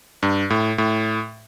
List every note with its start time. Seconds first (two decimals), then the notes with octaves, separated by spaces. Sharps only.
0.23 G2
0.50 A2
0.78 A2